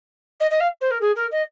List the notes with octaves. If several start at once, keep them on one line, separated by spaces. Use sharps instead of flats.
D#5
D#5
F5
C5
A#4
G#4
A#4
D#5